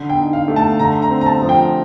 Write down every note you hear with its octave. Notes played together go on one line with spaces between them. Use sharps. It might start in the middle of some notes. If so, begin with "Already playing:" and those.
Already playing: D3
G5
D#4
F5
A3
A5
D3 A#5
A#5
C4
A#5
A5
F3
G5